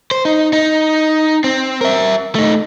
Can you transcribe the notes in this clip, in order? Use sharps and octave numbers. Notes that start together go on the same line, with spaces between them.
C5
D#4
D#4
C4
A#4 E5
A3 D#4